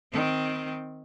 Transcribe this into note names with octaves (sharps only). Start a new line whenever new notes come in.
D#3 C4